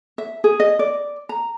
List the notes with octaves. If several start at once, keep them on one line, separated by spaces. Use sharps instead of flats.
E5
G#4
D#5
D5
A#5